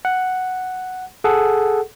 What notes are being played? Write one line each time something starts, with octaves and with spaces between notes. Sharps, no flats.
F#5
G#4 A4 F#5